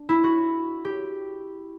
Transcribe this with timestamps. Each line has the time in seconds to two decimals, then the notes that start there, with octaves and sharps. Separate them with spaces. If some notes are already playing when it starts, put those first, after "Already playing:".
Already playing: D4
0.09 E4
0.24 F#4
0.85 G4